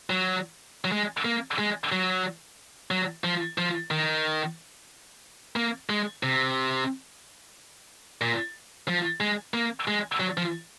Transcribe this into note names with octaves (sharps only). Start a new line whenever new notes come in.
F#3
F#3
G#3
A#3
G#3
F#3
F#3
F3
F3
D#3
A#3
G#3
C3
A#2
F3
G#3
A#3
G#3
F#3
F3